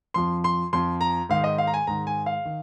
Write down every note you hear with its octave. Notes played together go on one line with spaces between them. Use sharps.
F2 F3 C6
C6
F2 F3 C6
A#5
G#2 D#3 F5
D#5
F5
A#5
G#5
G#2 D#3 A#5
G#5
F5
D#3